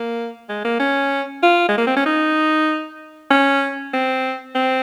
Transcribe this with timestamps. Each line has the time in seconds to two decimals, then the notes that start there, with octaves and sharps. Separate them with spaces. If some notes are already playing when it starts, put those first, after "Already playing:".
Already playing: A#3
0.49 G#3
0.64 A#3
0.79 C#4
1.43 F4
1.69 G#3
1.78 A#3
1.87 C4
1.96 C#4
2.06 D#4
3.31 C#4
3.93 C4
4.55 C4